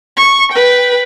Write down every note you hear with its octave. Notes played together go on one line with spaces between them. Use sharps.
C#6
B4 G5